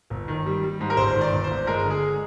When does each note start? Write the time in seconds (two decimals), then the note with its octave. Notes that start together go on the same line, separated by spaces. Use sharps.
0.10 G1
0.28 D#3
0.46 G3
0.63 G3
0.81 G#2
0.90 A#4
0.97 G1 C5
1.15 D#3
1.21 D5
1.32 G1
1.44 C5
1.51 G1
1.67 G#3 A#4
1.85 D3
1.90 G#4